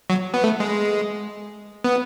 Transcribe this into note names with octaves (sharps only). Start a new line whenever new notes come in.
F#3
B3
A3
G#3
B3